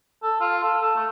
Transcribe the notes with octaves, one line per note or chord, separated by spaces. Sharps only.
A4
F4
A4
A4
A3